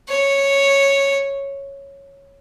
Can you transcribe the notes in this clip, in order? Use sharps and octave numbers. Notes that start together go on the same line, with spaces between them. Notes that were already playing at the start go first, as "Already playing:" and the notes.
C#5